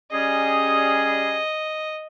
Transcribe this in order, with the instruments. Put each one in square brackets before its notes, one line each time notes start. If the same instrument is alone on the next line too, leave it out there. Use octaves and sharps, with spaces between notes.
[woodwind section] G3 C#4 G#4 [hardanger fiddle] D#5